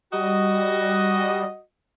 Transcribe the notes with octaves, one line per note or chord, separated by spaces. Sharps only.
G3 F#4 D#5